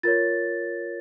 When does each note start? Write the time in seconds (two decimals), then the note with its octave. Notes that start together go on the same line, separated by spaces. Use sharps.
0.03 F4 A#4 C#5 A6